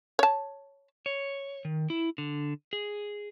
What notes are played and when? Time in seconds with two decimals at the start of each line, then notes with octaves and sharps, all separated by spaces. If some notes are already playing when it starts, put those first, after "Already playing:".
0.19 C#5 A5
1.06 C#5
1.65 D#3
1.90 E4
2.18 D3
2.73 G#4